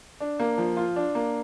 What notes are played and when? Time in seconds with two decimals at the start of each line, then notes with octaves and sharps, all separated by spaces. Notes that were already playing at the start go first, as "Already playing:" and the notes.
0.20 D4
0.39 A#3
0.58 F3
0.77 F4
0.96 D4
1.15 A#3